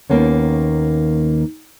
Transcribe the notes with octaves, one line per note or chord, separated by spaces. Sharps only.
D#2 C3 D#3 A#3 B3 C#4